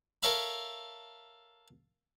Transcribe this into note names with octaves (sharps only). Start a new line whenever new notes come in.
A4 A#4 C#5 E5 F5 B5